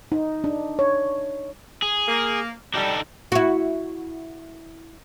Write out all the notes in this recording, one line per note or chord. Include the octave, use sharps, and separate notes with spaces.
D#4
D4
C#5
G#4
A#3
G3 D4 D#4 A4
E4 F#4